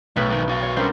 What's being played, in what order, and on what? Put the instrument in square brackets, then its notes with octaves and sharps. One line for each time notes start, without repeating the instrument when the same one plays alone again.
[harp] B1 B4 [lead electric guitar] A2
[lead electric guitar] G#2 D#3
F#4 F5
[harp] C#5
[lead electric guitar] G3 C#4 [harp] D4 A#4 C5